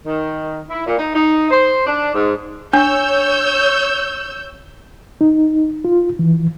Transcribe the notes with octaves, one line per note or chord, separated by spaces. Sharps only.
D#3
E4
A#2
D#4
D#4
C5
D4
G#2
D4 C#5 E6 G6
D#4
F4
E3